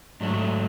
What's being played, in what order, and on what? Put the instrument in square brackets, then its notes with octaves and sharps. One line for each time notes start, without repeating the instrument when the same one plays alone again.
[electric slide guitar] G#2 F#3 A3 D4